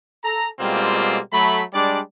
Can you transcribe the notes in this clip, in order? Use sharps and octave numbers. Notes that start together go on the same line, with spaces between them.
A4 A#5
B2 G3 G#3 A#3 C4 F4
F#3 A3 B5
G3 G#3 D4 D5